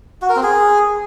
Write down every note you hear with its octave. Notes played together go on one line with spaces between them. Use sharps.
F#4
A#4
C4
G#4